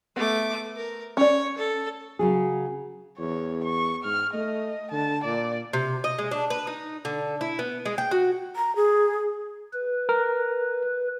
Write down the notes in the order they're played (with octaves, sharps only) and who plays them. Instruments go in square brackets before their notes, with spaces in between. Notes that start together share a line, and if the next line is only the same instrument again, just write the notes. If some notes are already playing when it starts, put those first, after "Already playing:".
[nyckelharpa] A3 D6 [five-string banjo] B3
[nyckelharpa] A#4
[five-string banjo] C#4 D5 [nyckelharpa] C#5
[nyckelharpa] A4
[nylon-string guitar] C#3 F#3 G#4
[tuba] E2 [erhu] C#5
[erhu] C#6
[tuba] G#2 [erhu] F6
[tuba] A3 [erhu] D#5
[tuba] D3 [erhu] A5
[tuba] A#2 [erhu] D5
[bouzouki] C3
D#5
G#3
D4
B4
D#4
D3
E4
B3
G#3
G5
F#4
[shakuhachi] A#5
G#4
[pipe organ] B4
[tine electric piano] A#4